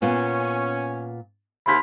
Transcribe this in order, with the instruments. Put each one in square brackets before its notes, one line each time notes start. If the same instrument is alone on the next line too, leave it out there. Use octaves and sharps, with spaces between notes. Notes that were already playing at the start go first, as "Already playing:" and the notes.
[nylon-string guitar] A#2 B3 F4 [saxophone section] C#4
[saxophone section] D#2 C3 A#3 [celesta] B5 C6 B6